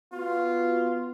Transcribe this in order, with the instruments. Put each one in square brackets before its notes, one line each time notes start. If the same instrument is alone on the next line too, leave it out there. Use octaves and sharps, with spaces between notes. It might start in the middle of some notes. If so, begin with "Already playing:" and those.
[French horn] B3 [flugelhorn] F4 [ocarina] F#4